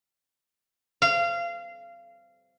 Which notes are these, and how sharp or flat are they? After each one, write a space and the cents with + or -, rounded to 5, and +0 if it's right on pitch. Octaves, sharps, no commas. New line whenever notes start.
F5 -25